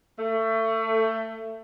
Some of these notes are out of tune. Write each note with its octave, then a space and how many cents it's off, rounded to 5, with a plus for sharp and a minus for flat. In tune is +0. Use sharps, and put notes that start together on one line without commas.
A3 +25